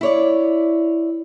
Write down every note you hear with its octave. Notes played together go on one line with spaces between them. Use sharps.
E4 C#5 D5